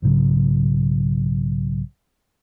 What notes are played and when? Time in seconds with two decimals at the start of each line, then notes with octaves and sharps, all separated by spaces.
0.02 B1 G#2 C#3 F#3